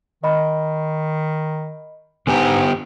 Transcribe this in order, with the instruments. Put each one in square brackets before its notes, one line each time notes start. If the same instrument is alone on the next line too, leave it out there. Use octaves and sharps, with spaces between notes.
[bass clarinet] D#3 [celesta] D#5 B5
[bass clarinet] G#2 [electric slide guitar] D3 B3 G4 [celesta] G#5